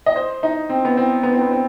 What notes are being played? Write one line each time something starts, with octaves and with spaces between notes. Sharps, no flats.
D#5
C5
D#4
C4
B3
C4
B3
C4
B3
C4